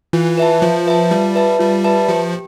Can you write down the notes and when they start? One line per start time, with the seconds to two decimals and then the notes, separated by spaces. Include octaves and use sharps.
0.13 E3 F4
0.38 B4 E5 A5
0.62 F3 F4
0.86 B4 E5 A5
1.11 G3 F4
1.35 B4 E5 A5
1.59 G3 F4
1.84 B4 E5 A5
2.09 F3 G4